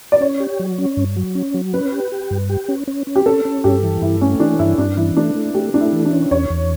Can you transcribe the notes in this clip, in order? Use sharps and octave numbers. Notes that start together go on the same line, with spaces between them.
D5
C#4 C#5
G4
F#3
C#4
G2
F#3
C#4
F#3
C#4 B4
G4
G4
G2
G4
C#4
C#4
C#4
G4
C#4 A4
C#4
G2 G4
E3
G2 E4
A3 C#4
E3 D4
G2 E4
G2 D4
E3 E4
A3 D4
A3
A3 G4
A3 D4
E4
E3
D4
C#4
E2 C#5
E2